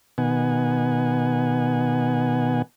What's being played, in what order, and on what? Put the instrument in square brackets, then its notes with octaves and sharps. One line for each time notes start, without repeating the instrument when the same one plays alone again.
[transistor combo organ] B2 D#3 B3 F#5 G#5